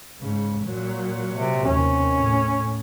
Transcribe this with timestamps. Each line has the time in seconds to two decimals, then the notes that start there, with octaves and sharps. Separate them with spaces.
0.20 G#2 C#3
0.64 A#2 F#3
1.33 C3
1.65 D#2 C3 C#4
2.15 A2